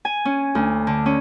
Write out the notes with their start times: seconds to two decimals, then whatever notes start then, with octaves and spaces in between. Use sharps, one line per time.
0.05 G#5
0.25 C#4
0.55 D2
0.87 D3
1.06 C#4